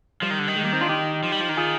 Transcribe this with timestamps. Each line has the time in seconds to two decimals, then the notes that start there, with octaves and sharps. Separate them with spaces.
0.22 F3 G3
0.31 D#3
0.39 D3
0.48 D#3
0.56 G#3
0.64 G3 A#3
0.72 C4 D#4
0.81 D4 F4
0.89 D#4 G4
1.23 F3
1.32 G3
1.40 F3
1.49 D#3
1.57 F4 G#4